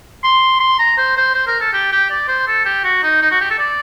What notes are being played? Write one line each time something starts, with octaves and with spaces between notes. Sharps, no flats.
C6
C6
A#5
C5
C5
C5
A#4
A4
G4
G4
D5
C5
A4
G4
F#4
D#4
D#4
F#4
G4
A4
D5